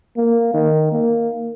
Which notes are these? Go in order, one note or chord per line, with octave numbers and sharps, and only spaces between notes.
A#3
D#3
A#3